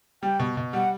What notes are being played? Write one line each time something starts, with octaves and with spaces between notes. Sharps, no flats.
G3 G5
B2
B2
G3 F#5